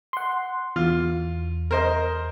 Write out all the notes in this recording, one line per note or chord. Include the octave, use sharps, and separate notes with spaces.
F#5 C6
E2 F4
A#4 C5 D#5